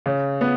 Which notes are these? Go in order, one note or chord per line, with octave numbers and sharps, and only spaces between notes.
C#3
B3